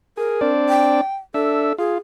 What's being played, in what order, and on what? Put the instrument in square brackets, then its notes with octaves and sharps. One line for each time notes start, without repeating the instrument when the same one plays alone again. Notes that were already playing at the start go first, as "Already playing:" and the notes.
[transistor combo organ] G#4 [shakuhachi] A#4
[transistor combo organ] C4 D4 D5
[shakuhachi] G5
[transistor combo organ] D4 E5 [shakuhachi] A4
[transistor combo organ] F4 [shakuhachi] G#4